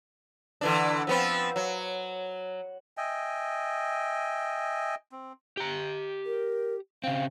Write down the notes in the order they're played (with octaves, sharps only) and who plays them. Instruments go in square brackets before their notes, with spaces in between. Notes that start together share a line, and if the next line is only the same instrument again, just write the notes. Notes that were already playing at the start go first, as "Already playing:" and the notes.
[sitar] D3 E3 D4
F3 B3 C4
F#3
[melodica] D#5 E5 G5 G#5
C4
[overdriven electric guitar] G4 A#5
[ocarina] A#4
[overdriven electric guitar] C#3 C4 [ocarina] F5